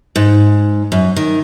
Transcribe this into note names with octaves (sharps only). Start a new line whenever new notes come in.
G#2
F#2
D#3